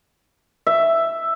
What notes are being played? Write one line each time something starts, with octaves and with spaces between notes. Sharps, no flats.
E5